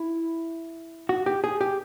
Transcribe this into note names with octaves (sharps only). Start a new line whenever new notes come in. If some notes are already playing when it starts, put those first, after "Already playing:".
Already playing: E4
F#4
G4
G#4
G4